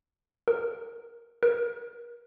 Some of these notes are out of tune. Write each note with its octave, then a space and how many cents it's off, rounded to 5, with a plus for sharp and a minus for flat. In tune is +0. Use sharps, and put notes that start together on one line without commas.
A#4 +10
A#4 +40